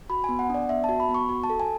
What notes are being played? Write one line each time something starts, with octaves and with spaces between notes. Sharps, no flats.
F#4 B5
B3 G#5
F#5
D4 D5
B3 E5
F#4 A5
B5
B3
C#6
F#4
A5
A4
G#5